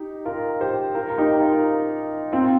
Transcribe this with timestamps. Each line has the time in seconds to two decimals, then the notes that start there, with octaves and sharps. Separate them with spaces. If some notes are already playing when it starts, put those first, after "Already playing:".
Already playing: D#4 G4
0.25 F4 A#4
0.60 G4 C5
0.94 F4 A#4
1.10 A#4
1.18 D#4 G4
1.41 F4 A#4
2.32 C4 F4